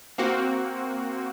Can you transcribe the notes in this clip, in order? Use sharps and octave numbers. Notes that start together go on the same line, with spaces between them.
A#3 C4 F#4